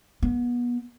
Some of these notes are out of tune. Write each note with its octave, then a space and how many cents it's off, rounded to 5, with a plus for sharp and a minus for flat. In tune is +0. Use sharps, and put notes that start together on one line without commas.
B3 -30